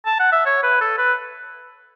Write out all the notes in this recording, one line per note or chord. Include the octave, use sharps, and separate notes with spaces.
A5
F#5
E5
C#5
B4
A4
B4